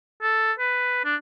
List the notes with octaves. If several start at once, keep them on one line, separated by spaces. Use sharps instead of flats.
A4
B4
D4